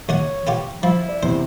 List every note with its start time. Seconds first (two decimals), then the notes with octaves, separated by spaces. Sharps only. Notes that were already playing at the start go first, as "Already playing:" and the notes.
0.09 D#2 C#4 C#5 F#5
0.47 B3 F4 G4
0.83 F3 E4
1.09 D5
1.23 E2 C3 C5